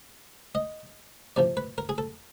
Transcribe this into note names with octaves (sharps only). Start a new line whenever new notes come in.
D#5
C3 F3 D5
B4
A#4
G#4
A4